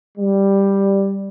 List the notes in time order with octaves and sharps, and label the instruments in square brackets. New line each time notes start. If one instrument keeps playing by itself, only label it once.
[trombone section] G3